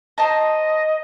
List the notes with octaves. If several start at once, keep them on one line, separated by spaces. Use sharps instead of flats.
C5 D#5 A5 A#5